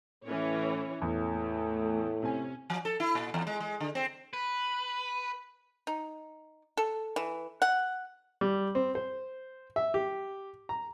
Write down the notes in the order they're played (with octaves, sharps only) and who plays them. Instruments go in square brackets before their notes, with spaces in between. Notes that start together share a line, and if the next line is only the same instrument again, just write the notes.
[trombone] A2 [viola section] E3 C#4 C#5
[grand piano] E2 [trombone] A2
[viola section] A3
[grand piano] C3 G#5 [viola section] C#4
[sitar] F3
A4
E4
A#2
E2
G#3
G#3
D3
C4
[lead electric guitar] B4
[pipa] D#4
A4
E3
F#5
[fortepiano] G3
C4
C5
E5
G4
A#5